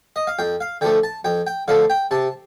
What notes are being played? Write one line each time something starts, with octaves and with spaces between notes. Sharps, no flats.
D#5
F5
F2 G5
F5
D3 F3 A3 G5
A5
F2 G5
G5
D3 F3 A3 F5
G5
C3 A5